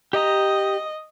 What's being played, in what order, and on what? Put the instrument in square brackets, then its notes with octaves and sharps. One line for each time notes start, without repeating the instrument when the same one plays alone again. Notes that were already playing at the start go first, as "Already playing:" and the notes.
[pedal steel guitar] G4 A#5 [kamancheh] D#5